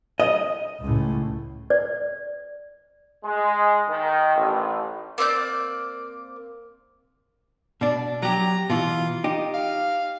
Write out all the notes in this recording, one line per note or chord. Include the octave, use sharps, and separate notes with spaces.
D#5
C#2 A2
D5
G#3
D#3
A1
A#3 C4 D5 G6
B2 D4 D5
F#3 G4 A#5
B2 E3 F4
D#4 G4
F5